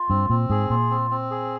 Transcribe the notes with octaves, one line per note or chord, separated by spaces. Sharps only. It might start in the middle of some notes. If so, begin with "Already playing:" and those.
Already playing: F4
G2 C4
A#2 C4
G#2 G#4
A#2 F4
C4
C4
G#4